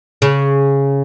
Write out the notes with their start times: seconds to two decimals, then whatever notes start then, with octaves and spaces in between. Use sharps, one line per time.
0.22 C#3